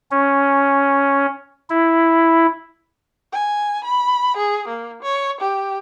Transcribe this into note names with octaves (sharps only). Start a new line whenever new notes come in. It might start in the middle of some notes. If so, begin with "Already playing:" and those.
C#4
E4
G#5
B5
G#4
A#3
C#5
G4